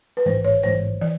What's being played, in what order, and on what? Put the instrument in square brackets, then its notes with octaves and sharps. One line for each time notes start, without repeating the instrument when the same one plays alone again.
[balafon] B4
[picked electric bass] A1 G#2 E3 G3 [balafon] C5
[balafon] C#5
[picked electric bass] A1 G#2 E3 G3 [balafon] C5
[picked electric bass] E3 [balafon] D5